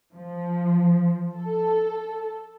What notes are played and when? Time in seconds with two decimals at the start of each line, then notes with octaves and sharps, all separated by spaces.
0.13 F3
1.37 A4